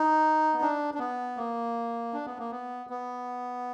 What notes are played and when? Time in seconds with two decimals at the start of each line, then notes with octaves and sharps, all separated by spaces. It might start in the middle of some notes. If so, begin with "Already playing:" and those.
Already playing: D#4
0.54 B3
0.62 D4
0.94 D4
0.99 B3
1.37 A#3
2.13 D4
2.26 B3
2.39 A#3
2.51 B3
2.90 B3